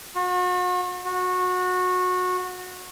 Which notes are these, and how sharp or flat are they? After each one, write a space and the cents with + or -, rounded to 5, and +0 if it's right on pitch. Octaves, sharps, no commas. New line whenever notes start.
F#4 -40
F#4 -20